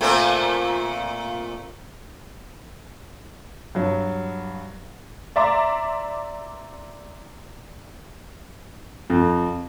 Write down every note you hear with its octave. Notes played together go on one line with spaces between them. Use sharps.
A#2 A3 C4
G2 F#3
D5 E5 A#5 C6 D6
F2